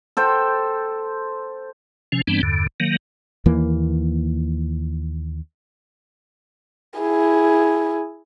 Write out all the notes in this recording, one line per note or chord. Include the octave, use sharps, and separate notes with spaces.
A4 C5 G5
C3 F3 C#4
G2 E3 G3 B3 C4 D4
E2 G2 D3
D#3 F#3 A#3
D#2 E3 A#3
E4 G#4